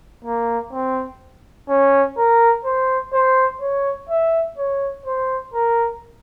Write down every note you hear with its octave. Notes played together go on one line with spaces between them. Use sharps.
A#3
C4
C#4
A#4
C5
C5
C#5
E5
C#5
C5
A#4